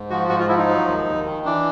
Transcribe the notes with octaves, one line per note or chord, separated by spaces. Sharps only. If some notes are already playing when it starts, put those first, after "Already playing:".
Already playing: G#2
F3 F#4
G#2 F#4
F4
F3 E4
D#4
F#3
D#2
D#2
D#3
E3 D4